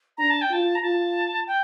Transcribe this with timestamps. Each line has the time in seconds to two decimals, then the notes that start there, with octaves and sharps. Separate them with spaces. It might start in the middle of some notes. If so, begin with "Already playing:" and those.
0.18 D4 A#5
0.30 A5
0.42 G5
0.50 F4 A5
0.75 A#5
0.82 F4 A5
1.47 G5